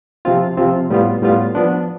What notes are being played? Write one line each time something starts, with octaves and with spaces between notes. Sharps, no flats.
C3 F3 C4 F4
C3 F3 C4 F4
A2 G3 B3 F4
A2 G3 B3 F4
F3 B3 D4